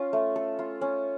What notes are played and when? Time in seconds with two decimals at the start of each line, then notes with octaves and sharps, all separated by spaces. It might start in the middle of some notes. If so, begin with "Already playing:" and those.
Already playing: C#4 F4
0.13 A3
0.36 A4
0.59 F4
0.81 C#4